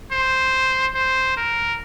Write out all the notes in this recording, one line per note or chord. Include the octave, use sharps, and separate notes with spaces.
C5
C5
A#4